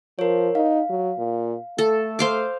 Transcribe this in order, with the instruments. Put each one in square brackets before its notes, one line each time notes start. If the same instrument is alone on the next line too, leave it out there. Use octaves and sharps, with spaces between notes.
[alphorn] F3 [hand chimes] A#4 C#5
[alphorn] D#4 [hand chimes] F5
[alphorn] F#3
A#2
[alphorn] A3 [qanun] A4
[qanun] C5 F5 D6